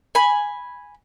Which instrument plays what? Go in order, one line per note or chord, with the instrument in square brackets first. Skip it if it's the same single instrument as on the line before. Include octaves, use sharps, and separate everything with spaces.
[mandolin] G#5 B5